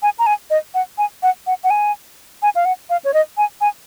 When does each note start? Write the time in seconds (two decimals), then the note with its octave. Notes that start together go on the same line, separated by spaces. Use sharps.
0.03 G#5
0.19 A#5
0.26 G#5
0.50 D#5
0.74 F#5
0.98 G#5
1.23 F#5
1.47 F#5
1.64 F#5
1.70 G#5
2.42 G#5
2.55 F5
2.65 F#5
2.90 F5
3.04 C#5
3.14 D#5
3.37 G#5
3.61 G#5